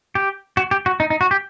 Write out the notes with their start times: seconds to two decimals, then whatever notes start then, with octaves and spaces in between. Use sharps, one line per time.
0.15 G4
0.57 F#4
0.71 G4
0.86 F#4
1.00 D#4
1.10 D#4
1.21 F#4
1.31 G4